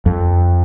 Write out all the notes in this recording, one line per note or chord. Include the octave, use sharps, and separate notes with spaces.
F2